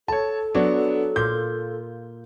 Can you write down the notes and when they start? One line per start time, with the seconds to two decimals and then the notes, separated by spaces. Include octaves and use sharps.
0.08 A4 C#5 A5
0.55 F#3 B3 D4
1.16 A#2 F4 G6